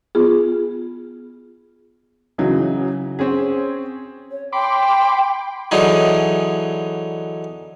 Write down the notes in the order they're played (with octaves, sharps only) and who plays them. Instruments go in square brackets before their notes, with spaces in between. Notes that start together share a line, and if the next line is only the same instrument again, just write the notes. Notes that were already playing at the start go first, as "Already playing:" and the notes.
[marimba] B3 F4 G#4
[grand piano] C#3 E3 F#3 D#4
C4 C#4 G#4
[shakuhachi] C#5
[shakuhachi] G5 [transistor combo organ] B5 C6 D6
[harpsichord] D3 E3 F#3 D#4 G#4